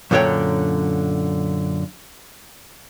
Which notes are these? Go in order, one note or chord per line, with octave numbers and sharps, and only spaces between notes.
F#2 A#2 D3 D4 C#5 G5